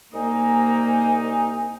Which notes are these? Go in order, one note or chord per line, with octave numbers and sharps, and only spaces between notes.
C2 A#3 D#4 G#5